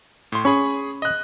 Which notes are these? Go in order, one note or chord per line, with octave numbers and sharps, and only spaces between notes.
A2 C6
C#4 G#4 B5 C#6
D#5 F#6